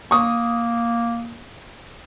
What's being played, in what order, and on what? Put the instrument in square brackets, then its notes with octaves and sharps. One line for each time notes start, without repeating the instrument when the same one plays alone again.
[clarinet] A#3 [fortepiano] C#6 D#6